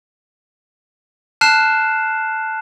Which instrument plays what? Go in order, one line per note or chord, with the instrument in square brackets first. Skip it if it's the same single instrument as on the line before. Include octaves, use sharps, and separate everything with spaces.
[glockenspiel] A5 F6 F#6 C7 E7